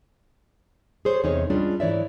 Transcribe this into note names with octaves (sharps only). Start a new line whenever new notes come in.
G#4 A4 C5 C#5
E2 C3 D#4 G#4 C#5
G3 G#3 C#4 D4 F4 G#4
G#2 E3 C#5 D5 E5